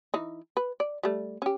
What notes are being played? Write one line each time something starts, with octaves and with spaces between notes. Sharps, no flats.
E3 D#4
B4
D5
G3 A3
C#4 G4